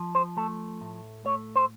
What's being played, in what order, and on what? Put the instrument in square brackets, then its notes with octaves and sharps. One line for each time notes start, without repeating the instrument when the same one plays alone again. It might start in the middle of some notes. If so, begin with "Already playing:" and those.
Already playing: [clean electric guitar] F3
C5
A3 A4
A2
A3 C#5
C5